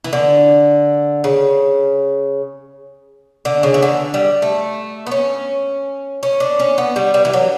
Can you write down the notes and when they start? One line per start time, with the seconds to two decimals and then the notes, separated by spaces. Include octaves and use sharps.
0.04 E3
0.13 D3
1.24 C#3
3.45 D3
3.63 C#3
3.74 E3
3.82 D3
4.14 G3
4.42 A3
5.07 B3
5.11 C#4
6.23 C#4
6.40 D4
6.59 C#4
6.78 B3
6.96 G3
7.14 G3
7.25 E3
7.33 F#3